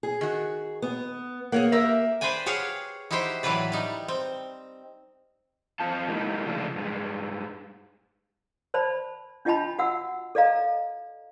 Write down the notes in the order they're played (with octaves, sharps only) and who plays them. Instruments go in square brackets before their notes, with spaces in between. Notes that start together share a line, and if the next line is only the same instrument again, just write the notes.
[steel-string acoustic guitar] G#4
[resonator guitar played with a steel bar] D#3 F#4
[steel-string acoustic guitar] B3
[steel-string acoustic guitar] A#3 [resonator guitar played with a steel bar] G#4 C#5 F#5
[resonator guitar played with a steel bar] G4 A#4 E5
[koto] B4 C5 D5 G5 G#5
G4 G#4 C#5 F5 F#5
D#4 E4 F#4 G4 C5 G5
A2 E3 F#3 E4 B4 D5
G3 D#4
C4
[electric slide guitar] F2 C4 F4 A5
F#3 G#3 A#3 D#4 E4 G4
C#3 F3 G#3 A3 D4
G2 G#3
[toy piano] C5 D5 A5 B5
D4 F4 D#5 G5 A5 B5
F#4 F#5 E6
A4 D5 D#5 F5 A#5